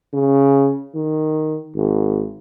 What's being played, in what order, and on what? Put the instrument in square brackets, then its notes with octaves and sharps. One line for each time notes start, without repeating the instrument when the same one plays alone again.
[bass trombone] C#3
D#3
G#1